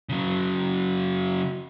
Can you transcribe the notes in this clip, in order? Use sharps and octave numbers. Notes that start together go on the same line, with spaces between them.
C#3 F#3